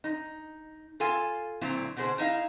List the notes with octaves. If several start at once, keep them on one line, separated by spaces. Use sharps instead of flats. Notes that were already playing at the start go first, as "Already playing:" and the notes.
D#4
F4 A4 F5 G#5
A#2 D3 F#3 C4 E4 F4
B2 D3 F#4 G#4 C5
D#4 E4 D#5 F5